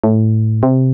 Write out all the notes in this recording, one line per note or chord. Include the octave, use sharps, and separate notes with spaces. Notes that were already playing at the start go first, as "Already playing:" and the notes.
A2
C3